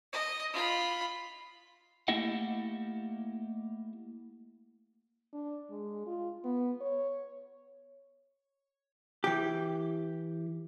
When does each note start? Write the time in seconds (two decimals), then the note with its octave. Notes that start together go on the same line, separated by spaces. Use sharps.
0.13 D#5
0.53 F4 B5
2.08 A3 A#3 E4 G4 D#5 F#5
5.33 D4
5.70 G#3
6.06 F4
6.44 B3
6.81 C#5
9.24 E3 G4